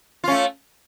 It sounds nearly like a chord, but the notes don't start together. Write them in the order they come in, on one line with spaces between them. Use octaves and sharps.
F4 C#4 A3